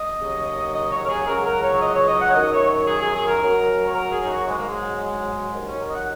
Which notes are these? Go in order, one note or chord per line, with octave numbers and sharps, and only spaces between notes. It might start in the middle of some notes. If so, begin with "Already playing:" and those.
Already playing: D#5
D#2 C#3 F#3
D#5
C#5
A#4
G#4
C#2 C#3 F#3 A#4
A#4
C#5
D#5
C#5
D#5
F#5
C#5
F#2 D#3 F#3 D#5
C#5
C#5
G#4
G#4
G#4
A#4
F#2 F#3
C#5
A#4
G#4
D#4
F#4
G#2 F#3 G#3
A#3
G#3
G#3
D#2 D#3 F#3
C#4
A#4
D#5
F#5